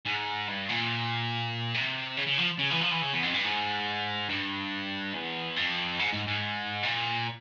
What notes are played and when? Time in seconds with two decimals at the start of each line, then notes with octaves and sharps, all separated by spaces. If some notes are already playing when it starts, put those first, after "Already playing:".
0.05 G#2
0.48 G2
0.69 A#2
1.74 C3
2.17 C#3
2.27 C#3
2.38 F3
2.59 C#3
2.71 E3
2.81 F3
2.91 E3
3.02 C#3
3.13 E2
3.23 F2
3.34 G2
3.44 G#2
4.29 G2
5.14 E2
5.56 F2
5.99 G#2
6.13 G#2
6.27 G#2
6.83 A#2